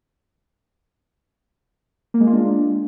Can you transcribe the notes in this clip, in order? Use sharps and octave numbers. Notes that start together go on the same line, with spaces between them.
A#3
G#3
F4
D4